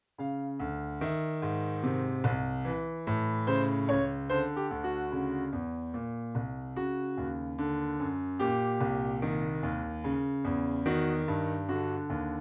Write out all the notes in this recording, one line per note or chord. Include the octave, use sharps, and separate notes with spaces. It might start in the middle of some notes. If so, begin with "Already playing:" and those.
C#3 F5
D2
D#3 E5
G#2
C3
C2
E3
A2
C#3 C5
C#2 C#5
D3 C5
G4
D2
F#4
C#3
E2
A#2
C2
C#3 F#4
D#2
D3
F#2
A#2 G4
C2
D#3
D#2
C#3
E2
D#3 F#4
G2
D3 F#4
D#2